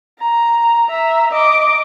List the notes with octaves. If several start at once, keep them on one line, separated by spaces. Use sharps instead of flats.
A#5
E5 A#5
D#5 D6